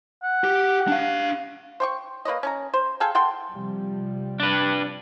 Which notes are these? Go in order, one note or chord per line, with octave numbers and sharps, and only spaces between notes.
F#5
G4
D4 F5
C5 G5 C#6
A#3 B4 C#5 D#5
C#4 G#5 A#5
C5
G#4 A4 F5 G5
A4 F#5 G5 C6
C3 F3 G3
D4 B4